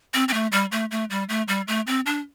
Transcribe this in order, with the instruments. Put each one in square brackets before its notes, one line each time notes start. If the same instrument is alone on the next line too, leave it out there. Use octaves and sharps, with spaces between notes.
[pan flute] C4
C4
A3
G3
A3
A3
G3
A3
G3
A3
C4
D4